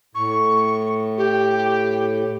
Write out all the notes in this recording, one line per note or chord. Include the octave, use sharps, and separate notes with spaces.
A2 C#6
G4